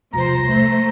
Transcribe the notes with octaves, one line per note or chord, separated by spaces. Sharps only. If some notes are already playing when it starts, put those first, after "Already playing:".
E1 C2 F3 C5 A#5
A3 C5